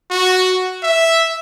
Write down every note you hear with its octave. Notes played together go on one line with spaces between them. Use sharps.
F#4
E5